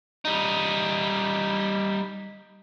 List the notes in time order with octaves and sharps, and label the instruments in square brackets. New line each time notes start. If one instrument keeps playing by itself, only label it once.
[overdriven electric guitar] G3 D#4